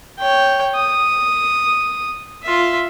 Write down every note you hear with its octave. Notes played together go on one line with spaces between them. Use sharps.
C#5 G5
D#6
F4 E5